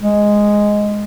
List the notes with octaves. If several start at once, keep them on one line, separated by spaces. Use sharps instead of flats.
G#3